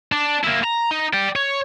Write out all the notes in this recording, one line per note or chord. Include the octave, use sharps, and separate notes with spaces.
D4
A#3 E4
A#5
D#4
D5 G5
C#5